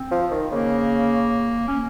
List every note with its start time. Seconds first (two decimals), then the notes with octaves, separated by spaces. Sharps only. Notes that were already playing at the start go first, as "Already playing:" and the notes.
Already playing: C4
0.11 F3
0.31 D#3
0.52 C#3 A#3
1.68 C#4